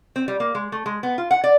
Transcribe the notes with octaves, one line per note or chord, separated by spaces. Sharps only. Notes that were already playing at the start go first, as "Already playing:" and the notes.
C4
G3
A#3
G#3
A3
G#3
B3
F4
F#5
D5